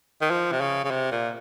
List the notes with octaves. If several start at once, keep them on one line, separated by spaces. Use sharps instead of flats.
D#3
F3
C3
C#3
C#3
C3
A#2